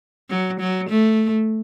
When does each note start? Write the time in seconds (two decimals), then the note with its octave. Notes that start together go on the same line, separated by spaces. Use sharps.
0.30 F#3
0.60 F#3
0.89 A3